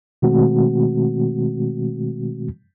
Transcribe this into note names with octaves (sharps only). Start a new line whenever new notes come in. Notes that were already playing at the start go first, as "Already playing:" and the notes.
B2 D#3 G#3 A3 C4 F#4